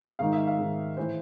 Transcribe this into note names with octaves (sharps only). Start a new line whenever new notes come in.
G#2 D#3 F5
E5
F5
G#2 D#3
A2 E3 C5